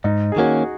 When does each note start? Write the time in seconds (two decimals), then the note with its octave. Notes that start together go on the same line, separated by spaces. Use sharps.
0.04 G#2 D#4
0.32 G#4
0.36 D#3 A#3 C#4 F#4